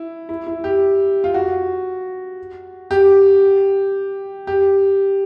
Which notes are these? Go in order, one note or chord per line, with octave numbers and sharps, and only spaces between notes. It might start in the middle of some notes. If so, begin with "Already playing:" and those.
Already playing: E4
E4
E4
G4
F4
F#4
G4
G4